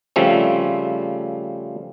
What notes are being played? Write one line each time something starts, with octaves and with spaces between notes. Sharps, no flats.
C#3 F3 G3 A3 C4